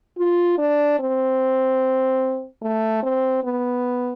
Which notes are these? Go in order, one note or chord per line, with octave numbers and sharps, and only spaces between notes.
F4
D4
C4
A3
C4
B3